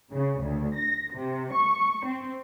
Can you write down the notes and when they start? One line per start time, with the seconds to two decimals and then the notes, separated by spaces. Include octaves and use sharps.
0.12 C#3
0.42 D2
0.76 A#6
1.13 C3
1.53 C#6
2.05 C4